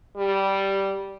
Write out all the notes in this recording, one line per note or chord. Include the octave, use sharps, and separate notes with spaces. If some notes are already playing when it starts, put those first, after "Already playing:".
G3